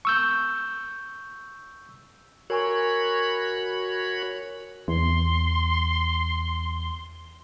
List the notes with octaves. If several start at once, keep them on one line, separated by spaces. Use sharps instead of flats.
C#6 E6 G6
F#4 A#4 C#5 G#5 B5 C#6
E2 C6